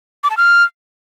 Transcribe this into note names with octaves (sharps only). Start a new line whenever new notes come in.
D6
A5
F6